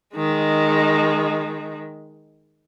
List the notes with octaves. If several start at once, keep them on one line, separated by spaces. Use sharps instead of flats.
D#3 G#3